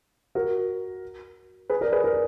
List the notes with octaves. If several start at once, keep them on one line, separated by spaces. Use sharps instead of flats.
F#4 A#4
G#4 B4
A#4 D5
G#4 B4
A#4 D5